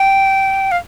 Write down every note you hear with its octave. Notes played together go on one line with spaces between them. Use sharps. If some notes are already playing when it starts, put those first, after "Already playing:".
Already playing: G5
F5